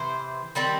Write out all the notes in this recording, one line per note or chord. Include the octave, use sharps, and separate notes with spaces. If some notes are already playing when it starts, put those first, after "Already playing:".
Already playing: C3 E3 C5
D#3 G3 C4